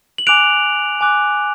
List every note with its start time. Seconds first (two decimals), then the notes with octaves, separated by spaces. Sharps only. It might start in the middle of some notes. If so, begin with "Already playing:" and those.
0.18 F#7
0.27 G#5 D6 F#6 D7 F7
1.01 G#5 D6 F#6